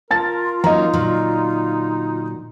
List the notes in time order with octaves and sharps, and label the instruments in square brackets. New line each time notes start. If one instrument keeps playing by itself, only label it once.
[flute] F4 [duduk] A#4 [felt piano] A5 A6
[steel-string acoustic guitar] F#3 A#3 C#4 [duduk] D#4 [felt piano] D#5 A#5
[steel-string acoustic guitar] A#2 D3 F#3